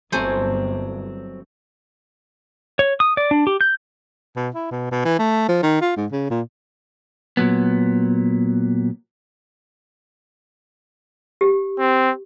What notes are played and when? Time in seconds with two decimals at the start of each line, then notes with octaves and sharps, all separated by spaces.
0.12 G1 G2 F#3 A3 C4 C5 G#5
2.79 C#5
3.00 D#6
3.17 D5
3.31 D4
3.47 G4
3.61 G6
4.36 B2
4.55 E4
4.71 B2
4.91 B2
5.05 E3
5.19 A3
5.48 F3
5.63 D#3
5.81 F4
5.97 G#2
6.12 C#3
6.31 A#2
7.37 A#2 F#3 B3
11.41 G4
11.80 C4